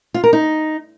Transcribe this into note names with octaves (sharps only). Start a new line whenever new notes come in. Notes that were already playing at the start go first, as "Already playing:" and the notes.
F4
A#4
D#4